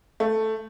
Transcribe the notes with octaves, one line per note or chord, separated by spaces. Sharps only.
A3